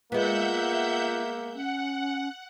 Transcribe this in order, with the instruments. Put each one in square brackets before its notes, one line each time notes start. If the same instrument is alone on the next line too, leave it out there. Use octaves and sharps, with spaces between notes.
[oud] G#3 B3 [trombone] A#3 [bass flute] F4 [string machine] E5 F#5 G6
[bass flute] C#4 [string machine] F#5